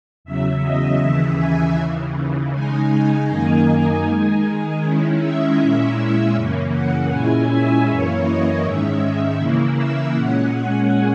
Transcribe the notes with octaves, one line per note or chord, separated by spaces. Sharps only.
E2 C#3 F#3 E5
D#5
D#2 C#3 E3 E5
G#5
D#2 C#3 E3
C#3 G#3 D#4 G#5
G#5
F#2 D#3 A#3 D#4
D#3 G#3 D#4 G#5
D#3 G#3 C#4 E4
E5
A#2 G#3 C#4 E4
F#2 C#3 E3 A#3 C#4
F#5
A#2 G#3 C#4 E4 G#5
E5
F#2 E3 A#3 C#4 E4 C#5
D#5
G#2 D#3 G#3 C#4 E5
C#3 E3 A#3 E4
E5
A#2 G#3 C#4 F#5
G#5